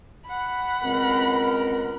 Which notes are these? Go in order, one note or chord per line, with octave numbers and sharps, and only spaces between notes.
F#5 B5
C#2 B2 C4 A#4